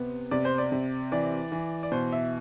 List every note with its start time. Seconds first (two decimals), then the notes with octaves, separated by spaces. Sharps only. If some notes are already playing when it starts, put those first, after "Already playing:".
Already playing: C3 B3
0.31 C3 D5
0.45 C5
0.58 D5
0.72 C3
1.12 E3 D5
1.52 E3
1.83 D5
1.92 B2 C5
2.12 E5